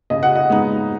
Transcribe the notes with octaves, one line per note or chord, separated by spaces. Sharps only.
C#3 D#5
F#5
D#5
G#3 B3 D#4